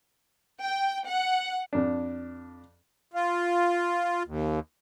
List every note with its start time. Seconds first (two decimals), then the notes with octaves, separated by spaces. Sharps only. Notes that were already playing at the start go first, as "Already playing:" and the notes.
0.61 G5
1.05 F#5
1.73 F2 D4
3.14 F4
4.27 D#2